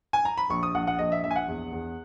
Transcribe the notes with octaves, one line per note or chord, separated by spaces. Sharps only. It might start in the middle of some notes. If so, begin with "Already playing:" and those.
G#5
A#5
B5
A#1 C#6
D#6
A#1 F#5
F#5
A#1 D#5
E5
A#1 E5
G#5
F#5
E2
E2